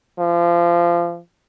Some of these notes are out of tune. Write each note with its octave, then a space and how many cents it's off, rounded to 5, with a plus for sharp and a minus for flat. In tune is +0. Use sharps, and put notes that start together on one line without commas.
F3 -25